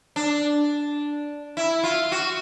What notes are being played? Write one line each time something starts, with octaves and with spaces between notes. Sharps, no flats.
D4
E4
F4
F#4